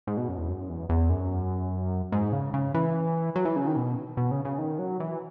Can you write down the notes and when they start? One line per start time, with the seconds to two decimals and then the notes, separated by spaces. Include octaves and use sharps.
0.07 G#2
0.17 B2
0.28 F#2
0.38 E2
0.49 F#2
0.69 E2
0.89 E2
1.10 F#2
2.12 G#2
2.33 C#3
2.54 C#3
2.74 E3
3.36 F#3
3.45 E3
3.56 C#3
3.67 D#3
3.76 B2
4.17 B2
4.31 C#3
4.45 C#3
4.58 D#3
4.79 F#3
5.00 E3